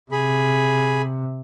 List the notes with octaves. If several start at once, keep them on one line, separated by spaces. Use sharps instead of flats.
C3 G#4 B5